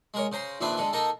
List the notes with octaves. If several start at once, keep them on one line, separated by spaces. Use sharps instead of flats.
G#3 A#4 C#5
C#3 C5 A#5 C6
A#1 D#2 C4 D4 B4 E5
D3 G#3 A4
A#3 D#4 A4 A5 A#5